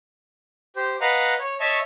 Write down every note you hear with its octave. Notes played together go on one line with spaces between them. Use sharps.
G4 C5
B4 D#5 F5 F#5 A#5
C#5
C#5 D#5 E5 A5 C#6